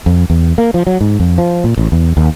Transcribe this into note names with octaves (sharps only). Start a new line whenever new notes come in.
F2
E2
A#3
F3
F#3
G#2
F2
F3
A#2
A1
E2
D#2